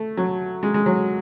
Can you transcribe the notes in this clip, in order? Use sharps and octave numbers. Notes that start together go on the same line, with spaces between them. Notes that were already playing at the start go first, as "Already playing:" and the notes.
Already playing: A3
F#3
G#3
G#3
F#3